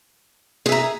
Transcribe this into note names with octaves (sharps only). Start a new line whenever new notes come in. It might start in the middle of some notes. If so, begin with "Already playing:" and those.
G#4 E5 A#5